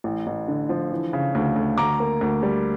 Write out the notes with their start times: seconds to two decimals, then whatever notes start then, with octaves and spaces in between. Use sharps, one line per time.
0.04 A1
0.27 A1
0.48 D3
0.69 F3
0.91 E3
1.13 C#3
1.35 D2
1.56 D2
1.78 D2 A#5 D6
2.00 A#3
2.21 D2
2.43 G3